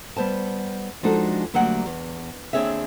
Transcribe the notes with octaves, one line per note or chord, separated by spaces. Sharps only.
G3 B3 C5 A5
F3 G#3 D4 D#4 F#4 A4
D2 F#3 G3 A#3 D5 F#5
E2
D#2 C4 D4 G#4 C#5 E5